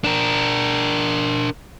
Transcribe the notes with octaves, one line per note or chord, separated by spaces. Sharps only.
D4 A#4